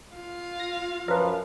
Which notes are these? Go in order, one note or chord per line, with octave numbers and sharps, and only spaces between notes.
F4 F5
A#6
F#2 F3 A#4 B4